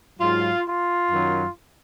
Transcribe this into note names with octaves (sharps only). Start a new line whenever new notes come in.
G#2 F#3 F4
F4
F#2 D#3 F#3